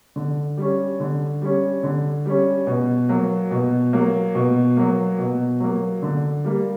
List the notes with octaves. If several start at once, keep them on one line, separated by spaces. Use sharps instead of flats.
D3
G3 C#4
D3
G3 C#4
D3
G3 C#4
B2
F#3 A#3
B2
F#3 A#3
B2
F#3 A#3
B2
F#3 A#3
D3
G3 A#3